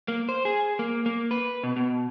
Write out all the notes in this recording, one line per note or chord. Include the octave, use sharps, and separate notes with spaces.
A#3
C5
G#4
A#3
A#3
B4
B2
B2